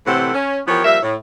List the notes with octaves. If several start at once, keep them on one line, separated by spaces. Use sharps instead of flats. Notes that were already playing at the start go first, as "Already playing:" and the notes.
A2 C3 E3 C4 A4 F#5
C#4
E3 F3 B3 G4 A#4 C#5
F3 G3 A#3 E5
A2